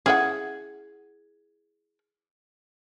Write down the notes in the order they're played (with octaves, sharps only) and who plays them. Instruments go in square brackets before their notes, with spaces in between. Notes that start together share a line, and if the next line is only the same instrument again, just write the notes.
[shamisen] C#4 E4 F#5 [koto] G#4